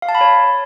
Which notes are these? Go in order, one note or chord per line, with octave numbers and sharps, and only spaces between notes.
F5
A5
B5
C#5